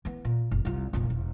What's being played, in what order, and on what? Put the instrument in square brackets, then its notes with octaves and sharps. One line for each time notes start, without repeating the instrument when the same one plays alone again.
[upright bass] E3 B3
A#2
F#1
C2 F4
F1 A#2
E1